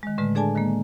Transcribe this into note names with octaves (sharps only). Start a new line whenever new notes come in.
D#3 G#3
A2 D3 G#3 A3 B4
D4 G#4 A4 D5 G#5 A5
D#3 G#3 A#3